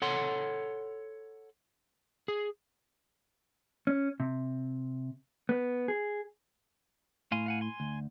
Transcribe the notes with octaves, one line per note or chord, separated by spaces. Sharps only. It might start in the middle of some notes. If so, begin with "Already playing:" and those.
A4 C#5 F#5 C6
G#4
C#4
C3
B3
G#4
A2 F5 G#5 C6
F5 F#5 G#5
G#5 C6
D2